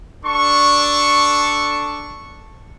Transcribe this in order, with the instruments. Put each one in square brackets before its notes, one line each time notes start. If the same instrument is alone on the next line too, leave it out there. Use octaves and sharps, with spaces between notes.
[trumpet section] D4 A4 C#6